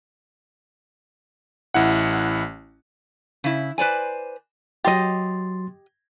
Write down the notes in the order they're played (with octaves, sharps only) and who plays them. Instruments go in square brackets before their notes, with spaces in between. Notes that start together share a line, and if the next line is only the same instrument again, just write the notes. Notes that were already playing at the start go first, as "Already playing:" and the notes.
[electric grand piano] A1 E4 F#5
[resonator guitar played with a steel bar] C#3 E4
B4 C5 D5 G#5
[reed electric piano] F#3 C6 A6 [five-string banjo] G4 D#5